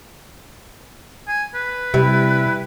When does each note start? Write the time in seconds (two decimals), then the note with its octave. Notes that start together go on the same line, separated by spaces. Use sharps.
1.28 G#5
1.55 B4
1.94 C3 G3 E4